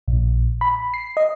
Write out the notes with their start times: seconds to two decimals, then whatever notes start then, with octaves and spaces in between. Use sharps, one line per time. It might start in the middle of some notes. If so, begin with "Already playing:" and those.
0.08 A#1
0.61 B5
0.94 C7
1.17 D#5